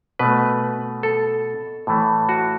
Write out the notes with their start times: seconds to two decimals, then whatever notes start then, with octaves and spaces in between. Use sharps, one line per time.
0.19 B2 A3 B4
1.03 A4
1.87 A2 E3 A3
2.29 F#4